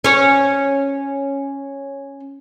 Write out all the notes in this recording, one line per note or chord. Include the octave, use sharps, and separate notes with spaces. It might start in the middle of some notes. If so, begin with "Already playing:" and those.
C#4 C#5